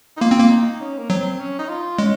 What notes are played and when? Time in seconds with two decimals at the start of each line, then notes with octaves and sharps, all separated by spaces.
0.17 D#4
0.21 A#3 F4
0.31 C4
0.40 A#3
0.50 D#4
0.81 C#4
0.98 A#3
1.10 F#3 C4
1.40 C#4
1.59 D#4
1.69 F4
1.98 G#3 C#4